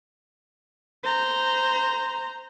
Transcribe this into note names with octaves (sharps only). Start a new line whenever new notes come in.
C5 A#5